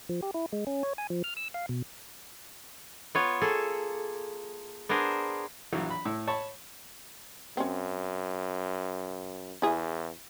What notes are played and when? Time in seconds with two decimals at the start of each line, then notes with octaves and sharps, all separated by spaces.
0.09 F3
0.23 G4
0.34 E4
0.53 G#3
0.67 C#4
0.83 C#5
0.98 G#5
1.10 F3
1.24 F6
1.37 E6
1.54 F5
1.69 B2
3.15 B3 F4 C#5
3.41 A#3 G#4 A4
4.89 B3 D4 G#4 A#4 C5
5.73 A#1 E3 F#3
5.90 B5
6.05 A2 E6
6.27 C#5 A5 B5 C#6
7.57 F#2 C4 C#4
9.62 E2 E4 G#4